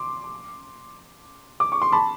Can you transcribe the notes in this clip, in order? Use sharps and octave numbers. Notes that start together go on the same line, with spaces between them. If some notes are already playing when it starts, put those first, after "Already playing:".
Already playing: C6 D6
D6
C#6
C6
A5 B5